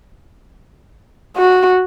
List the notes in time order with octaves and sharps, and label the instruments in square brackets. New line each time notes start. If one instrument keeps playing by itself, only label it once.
[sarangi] F#4